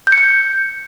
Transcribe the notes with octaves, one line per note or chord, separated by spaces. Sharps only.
G6
C#7
G6